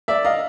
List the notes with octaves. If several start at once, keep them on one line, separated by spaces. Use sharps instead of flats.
D5 E5
D#5 F5